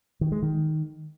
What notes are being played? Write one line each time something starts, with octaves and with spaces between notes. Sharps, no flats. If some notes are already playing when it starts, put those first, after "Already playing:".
D#3
G#3
D#3